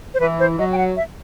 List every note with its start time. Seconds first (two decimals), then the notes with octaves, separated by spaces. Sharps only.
0.14 C5
0.20 E3 B4
0.39 C5
0.59 F#3 D#5
0.72 G5
0.78 F#5
0.97 E5